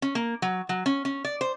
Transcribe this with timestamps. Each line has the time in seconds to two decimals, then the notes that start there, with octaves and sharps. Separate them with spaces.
0.02 C#4
0.15 A#3
0.42 F#3
0.69 F#3
0.86 C#4
1.05 C#4
1.25 D5
1.41 C5